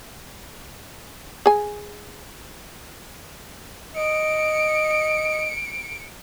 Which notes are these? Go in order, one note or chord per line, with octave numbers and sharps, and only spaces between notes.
G#4 G#5
D#5 C#7 D7